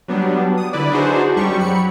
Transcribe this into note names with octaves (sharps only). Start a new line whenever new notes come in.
F#3 G3 B3 D4
D#6
D3 E4 B4 D5
D4 D#4 F#4 G#4 C5
F#2 G3 G4 C#6
F#3 B5 C#7